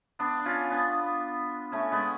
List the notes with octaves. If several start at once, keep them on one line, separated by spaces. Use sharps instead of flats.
B3 D4
C#4 F4
B3 D4
A3 C#4
G#3 B3